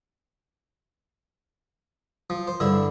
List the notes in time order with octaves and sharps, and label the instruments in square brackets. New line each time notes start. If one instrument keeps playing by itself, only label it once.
[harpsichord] F3
C5
G2 D3 E4